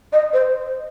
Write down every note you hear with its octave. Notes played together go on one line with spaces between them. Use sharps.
D#5
C5